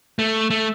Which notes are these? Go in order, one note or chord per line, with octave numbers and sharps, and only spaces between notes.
A3
A3